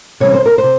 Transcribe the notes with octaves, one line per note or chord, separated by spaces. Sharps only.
C3 E3 G3 C#4 C#5
C5
A#4
C5
C3